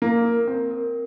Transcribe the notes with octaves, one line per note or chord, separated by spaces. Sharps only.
A#3 A#4
A#4
C4 A#4
A#4